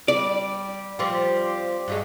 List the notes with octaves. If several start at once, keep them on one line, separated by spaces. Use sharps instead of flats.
G3 D5
F3 G3 C4 G4
G2 F#3 G#3